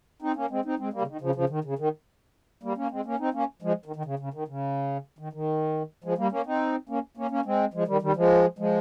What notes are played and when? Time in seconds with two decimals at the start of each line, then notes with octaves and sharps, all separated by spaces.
0.22 C4 D#4
0.36 A#3 C#4
0.50 G#3 C4
0.65 C4 D#4
0.79 G#3 C4
0.93 G3 A#3
1.01 C#3
1.07 D#3
1.21 C#3 F3
1.35 C#3 F3
1.49 D#3
1.64 C#3
1.79 D#3
2.63 G3 A#3
2.77 A#3 C#4
2.91 G#3 C4
3.05 A#3 C#4
3.19 C4 D#4
3.34 A#3 C#4
3.62 F3 G#3
3.86 D#3
3.96 D#3
4.05 C#3
4.19 C#3
4.34 D#3
4.48 C#3
5.19 D#3
5.33 D#3
6.04 F3 G#3
6.18 G3 A#3
6.31 A#3 C#4
6.46 C4 D#4
6.89 A#3 C#4
7.17 A#3 C#4
7.31 A#3 C#4
7.45 G#3 C4
7.74 F3 G#3
7.87 D#3 G3
8.01 D#3 G3
8.16 F3 G#3
8.58 F3 G#3